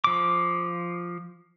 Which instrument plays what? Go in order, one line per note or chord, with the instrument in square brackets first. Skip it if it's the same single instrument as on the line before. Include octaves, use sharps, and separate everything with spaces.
[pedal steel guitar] F3 D6